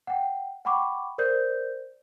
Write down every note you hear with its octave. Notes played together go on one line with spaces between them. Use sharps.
F#5 G5
F#5 G5 B5 C#6 D6
A#4 C5 D5 G6